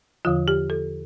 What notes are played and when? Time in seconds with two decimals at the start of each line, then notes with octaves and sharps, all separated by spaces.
0.25 E2 D3 F3 F4
0.48 G4
0.70 A4